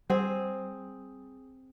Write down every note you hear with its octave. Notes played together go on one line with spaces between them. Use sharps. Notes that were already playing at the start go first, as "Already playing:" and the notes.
G3 C4 G#4